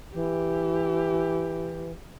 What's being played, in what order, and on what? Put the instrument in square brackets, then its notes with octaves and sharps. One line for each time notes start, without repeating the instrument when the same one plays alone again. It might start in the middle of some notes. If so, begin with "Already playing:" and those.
[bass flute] E3 [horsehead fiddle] G4